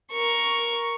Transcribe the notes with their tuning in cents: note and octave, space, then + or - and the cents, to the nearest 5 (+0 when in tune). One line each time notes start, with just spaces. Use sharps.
A#4 +10 C#6 +0